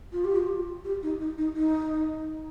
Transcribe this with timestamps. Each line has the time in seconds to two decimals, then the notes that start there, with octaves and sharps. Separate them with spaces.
0.13 F4
0.24 G4
0.36 F4
0.85 G4
1.03 D#4
1.21 D#4
1.38 D#4
1.57 D#4